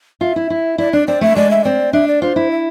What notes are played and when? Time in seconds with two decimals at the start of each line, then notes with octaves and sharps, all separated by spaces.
0.21 F4 E5
0.36 E4
0.50 E4
0.78 E4 D5
0.93 D4 D5
1.07 C4 D5
1.21 A3 E5
1.36 G#3 D5
1.51 E5
1.64 C4 D5
1.93 D4 E5
2.08 D5
2.22 F4 C5
2.36 E4
2.50 E5